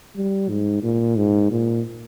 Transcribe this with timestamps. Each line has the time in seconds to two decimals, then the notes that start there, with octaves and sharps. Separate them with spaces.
0.16 G3
0.49 G#2
0.83 A#2
1.16 G#2
1.51 A#2